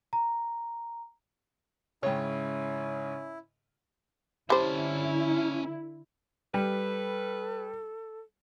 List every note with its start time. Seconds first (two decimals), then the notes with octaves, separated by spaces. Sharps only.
0.13 A#5
2.03 G#2 C#3 C4 C#4 E4 C#5
4.50 D3 G3 C#4 E4 C5 A5
6.54 G3 A4 B4